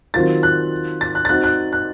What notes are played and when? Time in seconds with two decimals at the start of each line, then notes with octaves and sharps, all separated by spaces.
0.14 D#3 F#3 C4 F4 A6
0.43 F#6
1.01 A6
1.15 F#6
1.25 A6
1.29 C4 D#4 F#4 F#6
1.44 F#6
1.73 F#6